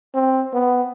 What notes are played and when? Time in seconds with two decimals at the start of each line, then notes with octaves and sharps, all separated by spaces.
0.14 C4
0.53 B3